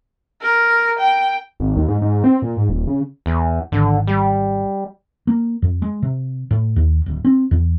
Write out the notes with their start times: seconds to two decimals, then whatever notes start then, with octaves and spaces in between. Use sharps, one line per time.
0.42 A#4
0.99 G5
1.60 G#1
1.76 D#2
1.88 G#2
2.02 G#2
2.24 C4
2.42 A#2
2.56 G#2
2.69 D#1
2.87 C#3
3.26 E2
3.72 G#1 D3
4.07 G3
5.27 A#3
5.62 F2
5.82 G#3
6.02 C3
6.51 A2
6.76 D#2
7.06 D1
7.25 C4
7.51 E2